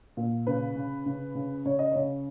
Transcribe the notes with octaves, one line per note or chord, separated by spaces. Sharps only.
A#2
C#3 B4
C#3
C#3
C#3
C#3 C#5
D#5
C#3 C#5